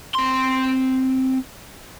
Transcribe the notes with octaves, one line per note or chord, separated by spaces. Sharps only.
C4 C6